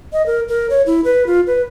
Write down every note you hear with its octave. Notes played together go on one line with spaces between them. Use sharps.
D#5
A#4
A#4
C#5
E4
B4
F4
B4